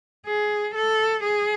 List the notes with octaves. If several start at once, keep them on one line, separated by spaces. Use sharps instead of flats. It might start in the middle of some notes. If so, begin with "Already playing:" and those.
G#4
A4
G#4